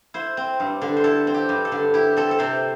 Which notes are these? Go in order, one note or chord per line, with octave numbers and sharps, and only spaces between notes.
E4 C5
C4
G2
D3
C5
E4 A4
C4
G4
G2
A4
D3
E4 G4
C4 A4
A4
C3 C5